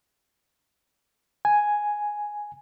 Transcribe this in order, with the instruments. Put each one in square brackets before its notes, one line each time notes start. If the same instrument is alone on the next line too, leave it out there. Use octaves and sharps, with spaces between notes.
[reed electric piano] G#5